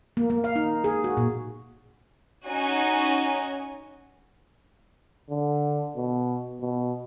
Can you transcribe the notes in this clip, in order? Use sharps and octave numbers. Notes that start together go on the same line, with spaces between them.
A#3
A#3
F5
D#4
G#4
F#4
A#2
C#4 D#4 F#4 G#5
D3
B2
B2